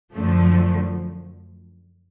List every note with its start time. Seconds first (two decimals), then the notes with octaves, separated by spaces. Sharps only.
0.13 F#2 D3 F3 A3